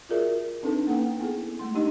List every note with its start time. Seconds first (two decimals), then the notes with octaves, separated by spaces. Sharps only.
0.09 F4 F#4 G#4 A#4 D5 E5
0.63 C4 D4 D#4 A4 B4 A5
0.87 A#3 C#4 B4 F#5 G5
1.20 B3 E4 G#4 A4
1.59 G#3 A3 C6
1.74 D4 D#4 G4 D#5